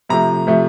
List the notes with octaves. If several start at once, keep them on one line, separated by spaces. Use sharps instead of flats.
C3 F3 A3 A#5
C3 F3 A3